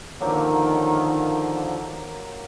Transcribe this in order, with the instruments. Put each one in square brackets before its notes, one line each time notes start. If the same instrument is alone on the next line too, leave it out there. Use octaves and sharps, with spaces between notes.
[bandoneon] D3 F3 [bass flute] D#3 [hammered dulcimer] F#3 A#3 G4